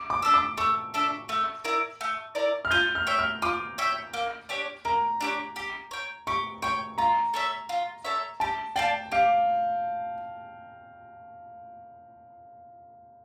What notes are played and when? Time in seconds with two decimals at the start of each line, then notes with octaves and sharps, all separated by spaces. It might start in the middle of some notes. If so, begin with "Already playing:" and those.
Already playing: D6
0.10 D6
0.22 D4 A4 E5
0.34 D6
0.58 A3 C#6
0.94 D4 A4 E5
1.29 A3
1.65 E4 A#4 D5
2.01 A3
2.35 E4 A#4 D5
2.65 F6
2.71 F4 G6
2.95 F6
3.07 C#5 E5 G5
3.19 F6
3.42 F4 D6
3.78 C#5 E5 G5
4.13 A#3
4.49 D4 G4 C#5
4.85 A#3 A#5
5.21 D4 G4 C#5
5.56 G4
5.91 C#5 G5
6.27 G4 C#6
6.62 C#5 G5 C#6
6.98 F4 A#5
7.34 A4 C#5 E5
7.69 F4
8.05 A4 C#5 E5
8.40 G4 A5
8.76 D5 F5 G5 A5
9.12 G4 F5